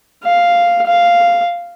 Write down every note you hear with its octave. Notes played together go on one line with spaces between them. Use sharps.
F5
F5